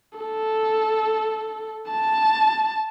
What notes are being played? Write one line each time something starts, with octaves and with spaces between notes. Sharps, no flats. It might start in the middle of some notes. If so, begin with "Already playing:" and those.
A4
A5